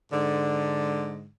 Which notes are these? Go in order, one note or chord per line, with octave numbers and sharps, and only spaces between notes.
G#2 D3